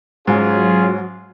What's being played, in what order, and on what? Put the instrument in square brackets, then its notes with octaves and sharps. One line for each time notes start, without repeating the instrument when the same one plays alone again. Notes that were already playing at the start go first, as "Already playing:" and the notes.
[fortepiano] G#2 [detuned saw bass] F#3 [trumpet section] C#4 F4 G#4